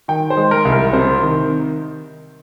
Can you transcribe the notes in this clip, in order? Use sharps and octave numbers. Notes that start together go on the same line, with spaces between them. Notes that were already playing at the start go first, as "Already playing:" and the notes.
D#3 G5
C5
G#3
A#4
C2
A#4
C3 C5
D#3